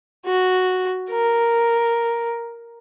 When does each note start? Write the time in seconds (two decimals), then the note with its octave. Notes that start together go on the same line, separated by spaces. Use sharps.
0.26 F#4
1.10 A#4